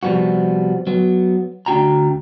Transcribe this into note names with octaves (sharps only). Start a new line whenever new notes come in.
C3 F3 G3 B3 F#4
F#3 B3
D2 D4 E4 F#4 G5 A#5